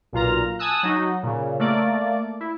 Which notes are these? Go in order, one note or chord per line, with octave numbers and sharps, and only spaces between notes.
B1 A#2 F4 A#5
G#5 A5 D#6 E6 F#6
F#3 D#4
A#2 C#3
A3 A#3 D5
E4